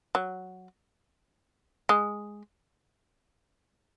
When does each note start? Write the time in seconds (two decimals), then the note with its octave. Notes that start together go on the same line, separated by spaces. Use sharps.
0.15 F#3
1.89 G#3